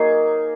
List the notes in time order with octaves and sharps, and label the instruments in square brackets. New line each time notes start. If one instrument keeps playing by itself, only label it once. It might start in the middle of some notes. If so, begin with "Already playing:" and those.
Already playing: [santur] F#3 A#3 D#4 G#4